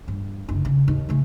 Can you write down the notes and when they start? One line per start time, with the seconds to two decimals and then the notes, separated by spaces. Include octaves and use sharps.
0.08 G2
0.48 F#1 D2
0.65 C#3
0.88 D#2
1.09 C#3 A3